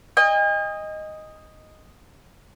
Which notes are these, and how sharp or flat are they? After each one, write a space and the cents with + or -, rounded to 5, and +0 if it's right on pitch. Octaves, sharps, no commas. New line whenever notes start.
D#5 +0 G#5 -45